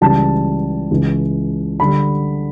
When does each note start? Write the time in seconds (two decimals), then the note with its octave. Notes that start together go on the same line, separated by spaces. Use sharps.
0.01 C#2 C#3 E3 G3 A5
0.91 C#2 C#3 E3
1.80 D3 G3 B5